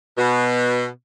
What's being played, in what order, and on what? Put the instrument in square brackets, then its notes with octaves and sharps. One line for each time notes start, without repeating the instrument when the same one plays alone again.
[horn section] B2